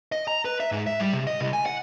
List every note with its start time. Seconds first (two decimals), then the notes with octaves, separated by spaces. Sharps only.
0.12 D#5
0.28 A#5
0.45 B4
0.60 E5
0.72 G#2
0.87 E5
1.00 G3
1.13 C3
1.27 D#5
1.41 C2
1.53 G#5
1.66 F#5